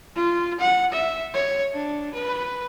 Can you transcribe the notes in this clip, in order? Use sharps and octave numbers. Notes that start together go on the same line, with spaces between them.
F4
F#5
E5
C#5
D4
B4